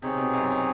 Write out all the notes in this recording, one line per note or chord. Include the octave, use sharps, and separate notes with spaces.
C3 C4 D#4 G#4 C#5
B2
F#2